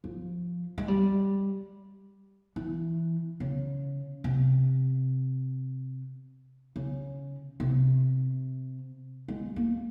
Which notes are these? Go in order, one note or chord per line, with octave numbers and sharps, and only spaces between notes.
F3
G#3
G3
E3
C#3
C3
C#3
C3
G#3
A#3